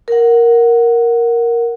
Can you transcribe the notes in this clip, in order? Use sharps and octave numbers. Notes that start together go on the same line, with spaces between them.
A#4 F#5